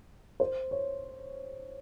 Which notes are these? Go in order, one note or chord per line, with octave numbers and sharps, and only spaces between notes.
C5
C#5